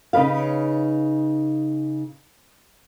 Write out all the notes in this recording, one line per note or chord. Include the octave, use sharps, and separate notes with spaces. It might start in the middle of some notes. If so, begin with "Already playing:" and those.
C#3 D#4 B4 F5